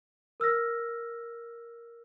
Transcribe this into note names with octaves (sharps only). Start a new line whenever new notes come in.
A#4 E6 F6 A#6